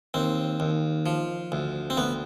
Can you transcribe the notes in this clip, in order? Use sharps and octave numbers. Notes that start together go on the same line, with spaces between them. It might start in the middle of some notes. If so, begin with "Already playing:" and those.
D#2 C4
D#2
F3
D2
C4
D2 B3